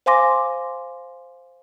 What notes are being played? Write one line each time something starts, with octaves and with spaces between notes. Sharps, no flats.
C5 F5 G#5 C6 D6 A#6